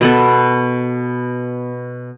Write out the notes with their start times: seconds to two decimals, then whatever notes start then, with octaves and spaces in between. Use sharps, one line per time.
0.01 B2 B3 A4